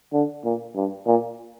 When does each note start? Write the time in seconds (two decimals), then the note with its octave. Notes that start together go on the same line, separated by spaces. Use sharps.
0.13 D3
0.45 A#2
0.75 G2
1.07 A#2